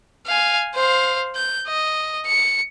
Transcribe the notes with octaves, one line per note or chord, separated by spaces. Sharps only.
F5 G#5
C5 F5
G6
D#5
C#7